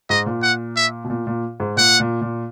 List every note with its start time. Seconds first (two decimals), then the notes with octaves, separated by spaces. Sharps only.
0.10 G#2 D#5
0.26 A#2
0.43 F#5
0.76 E5
1.04 B2
1.10 A#2
1.27 A#2
1.60 G#2
1.76 A#2 F#5
2.00 A#2
2.21 A#2